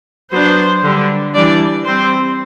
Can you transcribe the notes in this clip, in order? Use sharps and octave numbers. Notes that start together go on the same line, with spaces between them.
F#3 B3 D4 C5
D3 G3 D4
E3 G3 D4 D5
G3 C4 C5